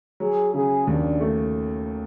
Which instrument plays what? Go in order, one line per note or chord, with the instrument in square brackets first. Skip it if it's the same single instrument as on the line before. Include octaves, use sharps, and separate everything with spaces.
[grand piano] F#3 [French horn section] G#4
[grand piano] C#3 [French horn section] G#4
[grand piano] D#2 [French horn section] D4
[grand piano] A3